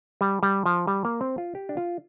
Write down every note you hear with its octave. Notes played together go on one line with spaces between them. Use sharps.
G3
G3
F3
G3
A#3
C4
F4
G4
D4
F4